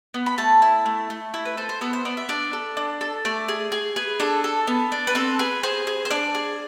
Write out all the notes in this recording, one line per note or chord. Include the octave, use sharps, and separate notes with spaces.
B3
B5
A3 A5
E4
A3
A3
E4
B4
A4 C5
C5
B3 A4
C5
B3 D5
E5
D4 D5
A4
D4
A4
A3 D5
G#4
G#4
G#4 B4
D4 A4
A4
B3
D4
B4
C4 A4
G#4 B4
G#4 C5
G#4
C5
D4 D5
G#4